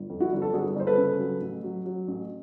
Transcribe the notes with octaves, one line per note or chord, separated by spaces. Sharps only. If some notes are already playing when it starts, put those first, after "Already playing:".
Already playing: G1
F2
E4 F#4
G1
A4
G1 F#4 G#4
G1 C5
A4 B4
C#3
F#3
A1
F#3
F#3
A1